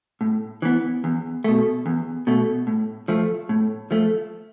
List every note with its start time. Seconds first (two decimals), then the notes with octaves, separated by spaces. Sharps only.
0.21 A2
0.62 E3 B3
1.04 E2
1.44 B2 A3
1.86 E2
2.27 B2 A3
2.67 A2
3.08 F3 A3
3.49 A2
3.91 F3 A3